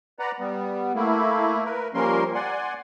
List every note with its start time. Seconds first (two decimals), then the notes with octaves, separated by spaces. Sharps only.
0.19 B4 D5 F#5 A#5
0.39 G3 B3
0.95 A3 A#3 E4
1.65 A#4 B4
1.94 F3 G3 A#3 C#4 A#4 C6
2.34 D5 F#5 G#5 C6